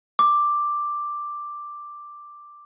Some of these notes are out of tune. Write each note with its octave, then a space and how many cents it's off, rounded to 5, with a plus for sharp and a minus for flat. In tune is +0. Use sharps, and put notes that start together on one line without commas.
D6 +5